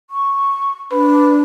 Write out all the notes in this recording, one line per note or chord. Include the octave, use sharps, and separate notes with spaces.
C#6
D4 B4